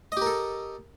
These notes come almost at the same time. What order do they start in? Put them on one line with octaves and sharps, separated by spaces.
D#5 G4 A#4 A4